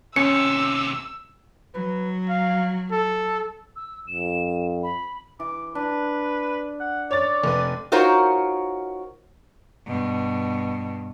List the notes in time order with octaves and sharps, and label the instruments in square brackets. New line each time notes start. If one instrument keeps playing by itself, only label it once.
[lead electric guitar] D#2 C3 [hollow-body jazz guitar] C#4 [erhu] E6 [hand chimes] C#7
[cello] F#3 [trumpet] B4
[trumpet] F5
A4
[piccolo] E6
[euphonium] F2 [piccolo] E7
[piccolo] B5
[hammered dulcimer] E3 [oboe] D6
[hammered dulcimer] D4 [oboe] B4
[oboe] F#5
[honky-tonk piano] C#5 A6 [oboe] D5
[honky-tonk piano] F1 B4
[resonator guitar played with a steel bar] D#4 F4 F#4 A#4 C5 C#5
[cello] G2 B2